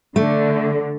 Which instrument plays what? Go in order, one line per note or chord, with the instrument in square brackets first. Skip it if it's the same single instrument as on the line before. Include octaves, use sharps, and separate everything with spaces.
[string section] D3 [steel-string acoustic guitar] A3